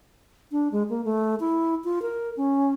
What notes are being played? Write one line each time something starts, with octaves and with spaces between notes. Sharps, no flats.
D4
G#3
A#3
A3
E4
F4
A#4
C#4